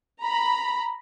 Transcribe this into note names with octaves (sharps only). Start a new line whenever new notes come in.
A#5 B5